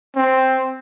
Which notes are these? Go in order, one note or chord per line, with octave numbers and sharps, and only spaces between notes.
C4